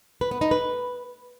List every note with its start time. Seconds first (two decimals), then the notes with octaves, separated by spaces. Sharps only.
0.21 B4
0.31 B3
0.41 D#4
0.51 B4